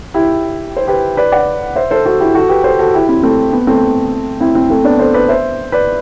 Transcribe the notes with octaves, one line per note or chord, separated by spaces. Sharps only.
E4 G4
C5
G4 B4
B4 D5
D5 F#5
C5 E5
A4 C5
F#4 A4
E4 G4
F#4 A4
G4 B4
A4 C5
F#4 A4
E4 G4
C4 E4
A3 C4
B3
A3 C4
C4 E4
C4 E4
A3 C4
B3 D4
A4 C5
B4 D5
C5 E5
B4 D5